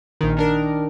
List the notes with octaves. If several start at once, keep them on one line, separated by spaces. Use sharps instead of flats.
A#1 D#3
D#3 D4 A#4